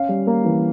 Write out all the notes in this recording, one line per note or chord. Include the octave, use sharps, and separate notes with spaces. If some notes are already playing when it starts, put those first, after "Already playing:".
Already playing: C#4 F5
G3
A#3
E3